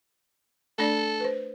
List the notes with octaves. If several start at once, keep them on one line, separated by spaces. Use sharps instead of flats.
A3 D4 A4 D5
B4 C5